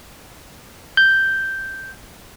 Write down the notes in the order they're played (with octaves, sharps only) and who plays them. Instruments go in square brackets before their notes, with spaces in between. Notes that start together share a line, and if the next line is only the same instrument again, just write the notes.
[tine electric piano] G6